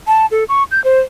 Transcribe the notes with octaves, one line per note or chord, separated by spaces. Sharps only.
A5
A4
C#6
G6
C5